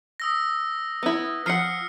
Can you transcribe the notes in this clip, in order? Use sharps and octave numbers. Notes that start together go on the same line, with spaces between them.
D#6 E6 A#6
B3 E4
F3 F#5 F6 C7 C#7